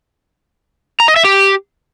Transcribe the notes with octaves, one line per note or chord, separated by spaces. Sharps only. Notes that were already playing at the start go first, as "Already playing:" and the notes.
A#5
D#5
E5
G4